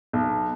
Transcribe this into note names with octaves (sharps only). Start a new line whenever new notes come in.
B1